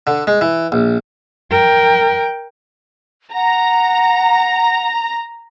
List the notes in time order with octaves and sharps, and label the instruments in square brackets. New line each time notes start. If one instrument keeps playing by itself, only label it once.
[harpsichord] D3
G#3
E3
A#1
[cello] A#4 G5
[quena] F#5 [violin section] A#5